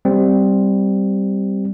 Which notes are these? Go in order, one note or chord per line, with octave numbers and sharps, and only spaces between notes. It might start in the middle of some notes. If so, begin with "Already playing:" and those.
G3 C4